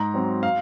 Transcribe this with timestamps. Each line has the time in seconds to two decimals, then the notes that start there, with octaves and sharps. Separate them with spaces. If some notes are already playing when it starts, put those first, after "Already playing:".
Already playing: G#2 A#5
0.14 F#3 C4
0.43 F5